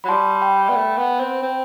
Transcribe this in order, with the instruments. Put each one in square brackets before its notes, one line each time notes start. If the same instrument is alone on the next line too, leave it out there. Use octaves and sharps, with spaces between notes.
[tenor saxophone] F#3 [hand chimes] B5
[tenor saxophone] G3 [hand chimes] A5 C6
[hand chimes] G5 B5
[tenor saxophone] B3
A3
B3
C4
C4